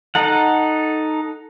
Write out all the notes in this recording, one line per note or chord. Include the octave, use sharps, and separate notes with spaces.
D#4 A4 F#5